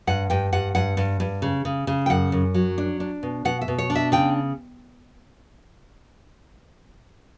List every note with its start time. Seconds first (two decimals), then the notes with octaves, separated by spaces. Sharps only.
0.07 G2 F#5
0.30 G2 G5
0.52 G2 F#5
0.75 G2 F#5
0.97 G2
1.20 G2
1.42 C#3
1.65 C#3
1.87 C#3
2.06 G5
2.10 F#2 F#5
2.32 F#2
2.54 F#3
2.78 D4
3.00 D4
3.23 B2
3.45 B2 F#5
3.61 E5
3.68 B2
3.78 C#5
3.90 D4
3.95 E5
4.12 C#3 G5